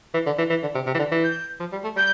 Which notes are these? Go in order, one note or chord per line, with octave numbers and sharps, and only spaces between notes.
E3
D3
E3
E3
D3
C3
C3
E3
D3
E3
G6
F3
G3
A3
G3 G6